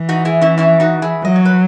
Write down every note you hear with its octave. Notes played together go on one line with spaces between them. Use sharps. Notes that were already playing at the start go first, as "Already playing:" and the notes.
Already playing: E3
D#4 F#4
E4 G#4
C#4 E4
C#4 E4
D#4 F#4
E4 G#4
F#3 D#5
C#5
B4